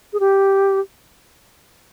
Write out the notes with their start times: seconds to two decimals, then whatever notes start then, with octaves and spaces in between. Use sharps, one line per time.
0.13 G#4
0.20 G4